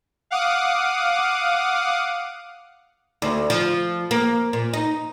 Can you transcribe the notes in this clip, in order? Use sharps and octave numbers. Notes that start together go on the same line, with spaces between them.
F5 F#5 D6 D#6
D2
F3
A#3
A#2
D#4